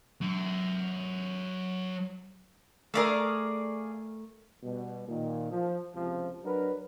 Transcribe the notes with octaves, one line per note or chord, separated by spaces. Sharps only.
F#3 E5
A3 G#4 A#4 D5 F5
B2 G3
A#2 D#3
F3
C#2 C3 F3
F#3 D4 A#4 B4